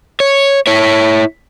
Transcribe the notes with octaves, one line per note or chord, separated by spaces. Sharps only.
C#5
E4 C#5